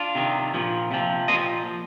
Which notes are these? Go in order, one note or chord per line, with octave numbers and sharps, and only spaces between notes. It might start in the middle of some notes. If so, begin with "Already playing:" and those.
Already playing: D4 F4
C3 D#3
A#2 F3
C3 F3
A#2 F3 C5 D#5